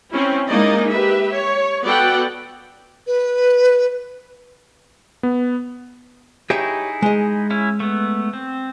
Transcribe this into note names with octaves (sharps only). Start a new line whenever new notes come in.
C4 C#4 E4
G#3 A#3 D#4 E4 D5 D#5
G4 B4 E5
C#5
B3 F#4 A4 D5 F#5 G5
B4
B3
D#4 E4 G4 G#4 C#5 E5
G#3 D#5
C#4 E4
A3 B3
C4